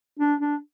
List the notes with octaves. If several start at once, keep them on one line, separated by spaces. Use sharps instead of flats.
D4
D4